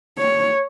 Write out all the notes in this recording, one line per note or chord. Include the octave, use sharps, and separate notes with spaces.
C#5